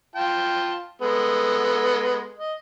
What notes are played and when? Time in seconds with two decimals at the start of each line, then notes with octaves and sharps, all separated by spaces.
0.16 F4 G5 A5
1.02 G#3 B3 A4
2.39 D#5